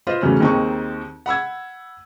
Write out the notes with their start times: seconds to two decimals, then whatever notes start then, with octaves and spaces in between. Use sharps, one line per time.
0.07 F4 B4 C5 D#5 F5 C6
0.22 E2 C#3 F#3 A3 B3 C#4
0.40 D#2 D#3 C4 D#4 G#4 C#6
1.26 F#5 B5 E6 G#6